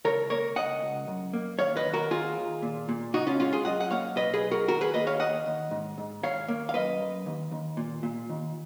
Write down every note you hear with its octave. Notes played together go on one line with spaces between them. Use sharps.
C#2 A#4 C#5
A#3 A#4 C#5
C#2 D#5 F#5
C#2
F#2
A#3
D#2 C#5 F5
B4 D#5
D#2
F#4 A#4
D#2 F4 G#4
D#2
A#2
A#2
C#2 D#4 F#4
C#4 F4
G#3 C#4 F4
F4 G#4
F#2 D#5 F#5
F#5
A#3 C#5 F5
B1 B4 D#5
G#4 B4
B1
F#4 A#4
D#2 F#4 A#4
G#4 B4
A#3 B4 D#5
C#5 F5
D#2 D#5 F#5
D#2
G#2
G#2
D#2 C#5 F5
A#3
F5
F#2 B4 D#5
F#2
D#2
D#2
A#2
A#2
D#2